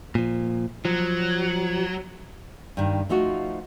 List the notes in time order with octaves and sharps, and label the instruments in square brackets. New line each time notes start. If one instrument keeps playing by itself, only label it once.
[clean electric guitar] A#2 F3
[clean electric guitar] F3 [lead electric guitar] F#3
[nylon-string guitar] G2 D#3
F3 A3 D#4 F4 F#4